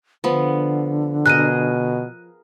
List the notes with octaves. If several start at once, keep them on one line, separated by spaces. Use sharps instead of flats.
D3 F3 B3
B2 G#4 A#4 D#5 F#6 D#7